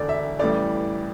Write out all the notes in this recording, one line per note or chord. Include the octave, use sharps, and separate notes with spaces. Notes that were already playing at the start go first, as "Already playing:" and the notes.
Already playing: E1 D2 D3 D5
E5
A1 A2 E3 G3 D5